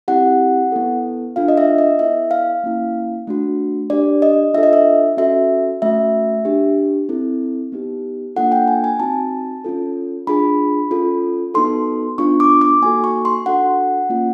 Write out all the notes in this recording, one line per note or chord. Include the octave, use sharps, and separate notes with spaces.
C4 E4 G4 F#5
B3 E4 A4
D4 F4 A4 F5
D#5
E5
D#5
B3 E4 A4 E5
F5
A#3 C#4 E4
A3 D4 F#4
D4 G4 D5
D#5
D4 F4 A4 E5
D#5
E5
C#4 F#4 A4 E5
A3 C#4 F#4 E5
D4 G4
C4 E4 A4
B3 D#4 G4
A#3 D4 F4 A4 F#5
G5
G#5
G#5
C4 D#4 F#4 A5
C#4 F4 A4
D4 F4 G#4 B5
C#4 F4 A4
B3 D#4 F#4 A4 C6
B3 D4 F4 C#6
D6
D6
A#3 D#4 F#4 A4 G#5
C#6
C6
D4 F#4 A4 F#5
A#3 C#4 F4